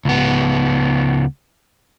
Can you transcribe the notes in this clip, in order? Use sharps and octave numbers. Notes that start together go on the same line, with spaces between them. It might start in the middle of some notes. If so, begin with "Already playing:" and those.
C#2 B3